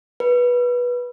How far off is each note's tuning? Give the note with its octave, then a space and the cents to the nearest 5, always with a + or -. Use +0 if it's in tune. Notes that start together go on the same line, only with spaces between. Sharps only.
B4 -15